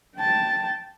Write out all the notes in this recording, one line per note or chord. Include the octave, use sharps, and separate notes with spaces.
G5 A5